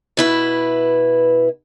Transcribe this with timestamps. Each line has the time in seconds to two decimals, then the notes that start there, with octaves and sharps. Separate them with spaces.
0.17 B2 E4 B4